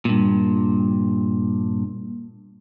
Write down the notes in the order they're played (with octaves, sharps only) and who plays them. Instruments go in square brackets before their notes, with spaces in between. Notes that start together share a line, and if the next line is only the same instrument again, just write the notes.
[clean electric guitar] G2 A#2